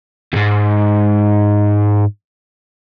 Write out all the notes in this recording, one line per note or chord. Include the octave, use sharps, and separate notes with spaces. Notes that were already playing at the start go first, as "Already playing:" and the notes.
E2 G#2